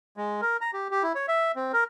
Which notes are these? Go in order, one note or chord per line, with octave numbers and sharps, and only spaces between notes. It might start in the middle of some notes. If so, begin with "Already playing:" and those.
G#3
A#4
A#5
G4
G4
E4
C#5
E5
C4
A#4